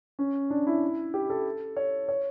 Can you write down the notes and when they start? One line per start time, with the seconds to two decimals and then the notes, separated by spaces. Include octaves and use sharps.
0.19 C#4
0.50 D4
0.67 E4
1.14 G4
1.30 A4
1.77 C#5
2.09 C#5